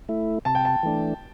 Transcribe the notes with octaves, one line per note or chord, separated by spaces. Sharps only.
A3 E4
C3 A5
G5
A5
E3 A3 D4